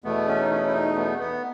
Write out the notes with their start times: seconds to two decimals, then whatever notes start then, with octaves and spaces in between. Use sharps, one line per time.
0.04 E2 B2 A3 B3
0.28 C#4
0.41 D#4
0.50 C#4
0.67 E4
0.73 D#4
0.96 B3
1.19 B3